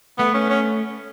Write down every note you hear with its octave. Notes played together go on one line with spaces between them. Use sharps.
A3 B3
C#4
C#4